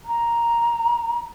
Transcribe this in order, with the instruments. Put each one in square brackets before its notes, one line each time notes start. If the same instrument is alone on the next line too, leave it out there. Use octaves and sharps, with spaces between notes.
[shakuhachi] A#5